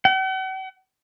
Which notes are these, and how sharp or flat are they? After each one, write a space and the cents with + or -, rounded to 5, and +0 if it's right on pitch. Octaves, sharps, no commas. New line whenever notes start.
F#5 +45